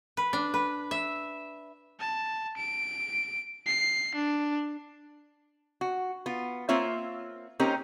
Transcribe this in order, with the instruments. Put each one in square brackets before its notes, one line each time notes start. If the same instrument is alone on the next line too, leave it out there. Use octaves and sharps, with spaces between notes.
[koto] B4
D4
B4
E5
[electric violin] A5
D7
C7
D4
[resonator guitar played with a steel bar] F#4
B3 F4
A#3 C4 F4 C#5 E5
A#3 C4 C#4 D#4 G4 A#4